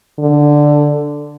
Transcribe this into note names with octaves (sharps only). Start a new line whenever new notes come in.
D3